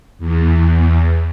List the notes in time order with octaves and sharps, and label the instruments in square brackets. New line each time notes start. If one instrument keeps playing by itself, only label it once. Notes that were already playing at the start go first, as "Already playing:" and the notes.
[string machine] E2